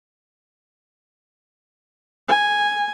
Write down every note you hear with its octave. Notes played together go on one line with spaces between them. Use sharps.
G#5